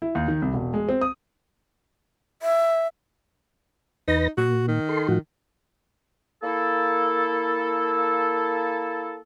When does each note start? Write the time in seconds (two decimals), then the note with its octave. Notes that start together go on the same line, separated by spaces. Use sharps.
0.02 E4
0.15 D#2
0.28 D#3
0.42 C2
0.54 E1
0.74 G#3
0.89 C4
1.01 D#6
2.42 E5
4.08 E2 D#4 B4 A#6
4.37 A#2 F#4
4.68 D#3
4.89 A4 C6
5.08 A2 F3 F#4
6.43 A#3 E4 A4